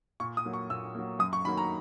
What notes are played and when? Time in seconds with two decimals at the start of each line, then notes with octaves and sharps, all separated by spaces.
0.20 A#2 C#6
0.37 D#6
0.46 F#3 A#3
0.54 C#6
0.70 A#2 E6
0.95 F#3 A#3
1.19 F#2 D#6
1.33 C#6
1.45 D#3 F#3 A#3 B5
1.58 A#5